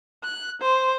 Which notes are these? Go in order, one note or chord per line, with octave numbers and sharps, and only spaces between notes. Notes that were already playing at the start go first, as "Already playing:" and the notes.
F#6
C5